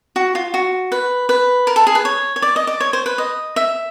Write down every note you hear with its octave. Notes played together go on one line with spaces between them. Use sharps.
F#4
F4
F#4
B4
B4
A#4
A4
G#4
B4
C#5
C#5
D5
D#5
D5
C#5
C5
B4
D#5
E5